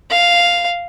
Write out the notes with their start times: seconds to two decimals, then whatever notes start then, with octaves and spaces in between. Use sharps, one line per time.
0.11 F5